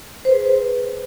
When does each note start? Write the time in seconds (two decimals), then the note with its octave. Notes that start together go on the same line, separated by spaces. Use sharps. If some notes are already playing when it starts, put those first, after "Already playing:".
0.25 C5
0.29 B4
0.33 G#4